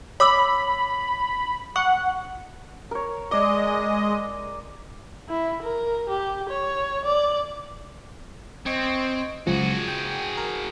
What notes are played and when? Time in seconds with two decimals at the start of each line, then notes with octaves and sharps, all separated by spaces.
0.20 C#5 B5 D6 E6
1.76 F#5 C#6
2.91 A#4 C#5
3.31 G#3 D5 D#5
5.29 E4
5.62 A#4
6.09 G4
6.49 C#5
7.04 D5
8.66 C4 D#5 C#6 G#6
9.47 C#2 F#2 F3 F#4 G#4
9.88 G5
10.37 A#4